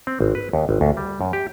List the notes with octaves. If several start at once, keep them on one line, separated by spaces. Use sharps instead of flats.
C4
G#1
B4
D#2
G#1
D2
G3
F#2
G4